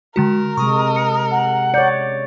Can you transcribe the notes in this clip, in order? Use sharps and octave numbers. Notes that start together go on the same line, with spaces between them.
D3 G#3 F#4 A#4
C3 G#3 C#6 D#6
C#7
F#5
C#5 D5 G6 C#7